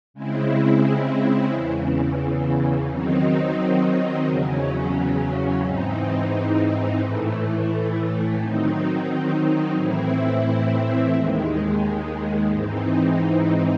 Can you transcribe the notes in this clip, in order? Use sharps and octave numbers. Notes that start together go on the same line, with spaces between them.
C#3 G#3 C4 E4
E2 C#3 E3
D#3 F#3 C4 D#4
E2 C#3 F#3 C#4
G#2 E3 C4 D#4
A2 E3 A3
D#3 F#3 C4 D#4
A2 E3 C4 E4
D#2 D#3 G#3
G#2 E3 C4 D#4